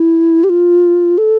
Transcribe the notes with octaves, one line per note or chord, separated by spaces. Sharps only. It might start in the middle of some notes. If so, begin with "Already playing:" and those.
Already playing: E4
G4
F4
A4